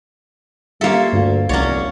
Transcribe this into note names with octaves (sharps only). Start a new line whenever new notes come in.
G3 A#3 C#4 F4 A4 E5
D2 G2
F1 C2 F#3 C#4 C#5 D5 A#5